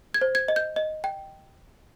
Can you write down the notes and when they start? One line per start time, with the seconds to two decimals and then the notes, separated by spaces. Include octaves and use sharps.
0.14 G#6
0.21 C5
0.35 G#6
0.48 D#5
0.56 G6
0.76 D#5
1.04 G5